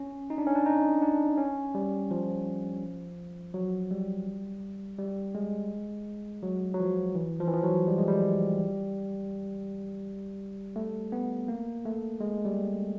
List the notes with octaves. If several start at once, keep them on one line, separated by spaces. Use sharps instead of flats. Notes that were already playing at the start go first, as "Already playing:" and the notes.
Already playing: C#4
D#4
D4
C#4
D4
D#4
D4
C#4
G3
F3
F#3
G3
G3
G#3
F#3
F#3
F3
E3
F3
E3
F3
F#3
G3
G#3
G3
A3
B3
A#3
A3
G#3
G3